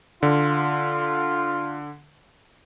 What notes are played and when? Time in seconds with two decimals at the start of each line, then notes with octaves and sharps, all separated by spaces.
0.23 D3 F4